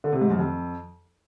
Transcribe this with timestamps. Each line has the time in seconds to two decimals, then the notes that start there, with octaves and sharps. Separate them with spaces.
0.04 D3
0.13 C3
0.21 G#2
0.30 F#2
0.39 F2